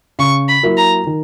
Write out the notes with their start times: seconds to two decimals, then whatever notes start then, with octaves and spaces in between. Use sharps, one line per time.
0.19 C#3 C#6
0.48 B5
0.63 F#3 A#3 E4
0.77 A#5
1.07 D#3